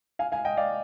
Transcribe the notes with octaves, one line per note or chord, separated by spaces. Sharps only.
F5 G#5
F5 G#5
D#5 G5
D5 F5